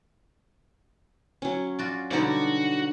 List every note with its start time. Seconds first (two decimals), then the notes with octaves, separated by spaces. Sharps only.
1.42 F#3 C#4
1.79 F4 F#4 D5
2.11 B2 D3 G3 D#4 F#4 D5